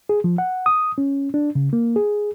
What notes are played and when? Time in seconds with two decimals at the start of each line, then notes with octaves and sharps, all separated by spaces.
0.09 G#4
0.24 F3
0.38 F#5
0.66 D#6
0.98 C#4
1.34 D4
1.55 C#3
1.73 A#3
1.96 G#4